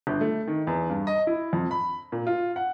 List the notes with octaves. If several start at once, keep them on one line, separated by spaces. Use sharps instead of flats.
G1
A3
D#3
E2
G2
D#5
E4
F2
B5
A#2
F4
F#5